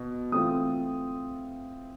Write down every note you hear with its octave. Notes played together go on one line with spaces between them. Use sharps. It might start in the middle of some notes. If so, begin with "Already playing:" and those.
Already playing: B2
E3 A3 C4 F4 D#6